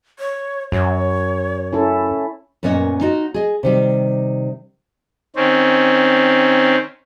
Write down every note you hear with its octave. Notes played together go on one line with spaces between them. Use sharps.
C#5
F#2 C#5
C#4 E4 A4
F#2 A#2 B3 C#4 C#5 D#5
D#4 F4 F#4 D#5
G#4 D#5
C3 D#3 G3
D#3 C4 C#4